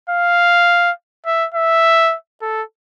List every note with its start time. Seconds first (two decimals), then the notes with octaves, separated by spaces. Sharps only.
0.10 F5
1.26 E5
1.55 E5
2.42 A4